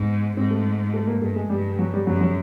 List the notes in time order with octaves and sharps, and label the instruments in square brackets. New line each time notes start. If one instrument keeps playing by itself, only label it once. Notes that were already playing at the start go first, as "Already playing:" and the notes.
Already playing: [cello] G#2 [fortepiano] B3
[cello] G#2 [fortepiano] C4
[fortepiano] A3
A3
A#3
[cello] G2 [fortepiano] A3
[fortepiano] G#3
[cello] G2 [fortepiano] G3
[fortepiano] F#3
G3
[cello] F#2 [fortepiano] F#3
[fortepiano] F#3